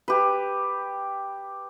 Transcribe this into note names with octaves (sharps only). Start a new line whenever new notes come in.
G4 B4